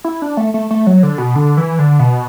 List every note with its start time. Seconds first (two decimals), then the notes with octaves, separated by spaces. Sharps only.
0.05 E4
0.22 D4
0.37 A3
0.54 A3
0.71 A3
0.87 F#3
1.03 D3
1.18 B2
1.35 D3
1.57 E3
1.79 D3
1.99 B2